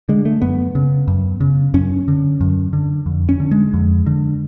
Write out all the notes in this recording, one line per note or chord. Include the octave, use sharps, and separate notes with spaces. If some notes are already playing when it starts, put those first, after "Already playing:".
D3 G#3
A3
F#2 B3
C#3
F#2
C#3
F#2 C#4
D3
F#2
D3
F2
C#4
D3
G#3
F2
D3